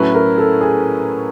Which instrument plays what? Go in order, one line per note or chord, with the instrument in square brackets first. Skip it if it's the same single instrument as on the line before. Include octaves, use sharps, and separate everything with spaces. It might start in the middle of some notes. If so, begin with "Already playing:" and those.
Already playing: [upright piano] A2 F#3 A3 C#4 E4 [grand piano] B4
[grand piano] A#4
A4
G#4